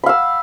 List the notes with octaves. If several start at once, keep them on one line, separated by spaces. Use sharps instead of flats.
F5 B5 E6